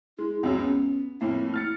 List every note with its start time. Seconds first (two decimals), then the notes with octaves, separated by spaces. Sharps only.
0.19 G#3 E4
0.43 C#2 F#2 C4
0.58 B3 C#4
1.21 F2 A2 A#3 E4
1.54 F6 A6 C#7